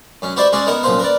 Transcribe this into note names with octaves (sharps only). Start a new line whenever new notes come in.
F#2 C#4
F#4 G4 B4 C5 D5 E5
G#3 C#4 F#4 G#4 D5
B3 D#4 E4 A#4 F#5
F#2 A#2 F3 C4 C5 F5
A#4 B4 D5